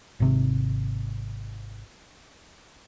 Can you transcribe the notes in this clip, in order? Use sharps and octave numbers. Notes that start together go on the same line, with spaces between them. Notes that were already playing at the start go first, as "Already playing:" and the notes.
G#1 C3